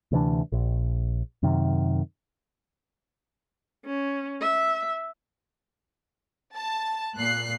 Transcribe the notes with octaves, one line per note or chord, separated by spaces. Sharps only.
D2 C3 E3 D4
A#1
F#2 C3 D#3
C#4
E5
A5
A#2 F#6 C7